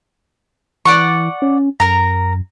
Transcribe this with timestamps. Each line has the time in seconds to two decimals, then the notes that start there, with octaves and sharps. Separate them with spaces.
0.85 E3 D5 F#5 C#6
1.42 C#4
1.80 F#2 A#4 A#5